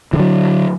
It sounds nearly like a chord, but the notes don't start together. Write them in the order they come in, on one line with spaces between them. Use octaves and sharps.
E3 D3 F#3